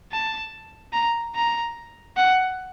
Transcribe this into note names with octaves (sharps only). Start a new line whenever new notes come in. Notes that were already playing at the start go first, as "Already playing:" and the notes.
A5
A#5
A#5
F#5